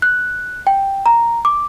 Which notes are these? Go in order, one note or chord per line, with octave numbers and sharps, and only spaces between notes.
F#6
G5
A#5
D6